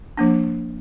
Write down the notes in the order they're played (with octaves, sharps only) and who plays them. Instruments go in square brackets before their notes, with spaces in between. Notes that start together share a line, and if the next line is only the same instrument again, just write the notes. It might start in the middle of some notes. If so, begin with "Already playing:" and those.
[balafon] F3 A#3 D4